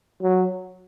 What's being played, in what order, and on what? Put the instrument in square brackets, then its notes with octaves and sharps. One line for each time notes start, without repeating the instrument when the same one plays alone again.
[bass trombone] F#3